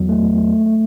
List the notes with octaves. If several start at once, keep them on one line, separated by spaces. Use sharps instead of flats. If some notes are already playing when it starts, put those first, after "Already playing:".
Already playing: E2 F#3
A3
E2
A3
A3
A3